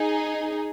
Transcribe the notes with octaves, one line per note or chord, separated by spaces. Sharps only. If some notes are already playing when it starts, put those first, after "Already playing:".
Already playing: D#4 G#4